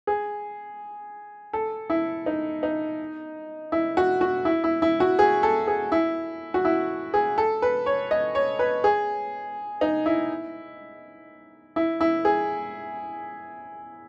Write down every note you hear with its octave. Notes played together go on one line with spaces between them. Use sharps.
G#4
A4
E4
D#4
D#4
E4
F#4
F#4
E4
E4
E4
F#4
G#4
A4
G#4
E4
F#4
E4
G#4
A4
B4
C#5
D#5
C#5
B4
G#4
D#4
E4
E4
E4
G#4